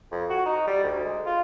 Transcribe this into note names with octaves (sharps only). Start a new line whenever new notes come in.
F2
F#4
D#4
G3
D2
G#3
F4